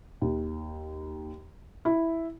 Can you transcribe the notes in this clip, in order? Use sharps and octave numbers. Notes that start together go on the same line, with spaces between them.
D#2
E4